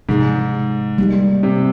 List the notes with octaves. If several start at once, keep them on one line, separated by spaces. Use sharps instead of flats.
G#2 C3 F3 G#3 D#4 G#4
G3 A#3 D#4 G4
C3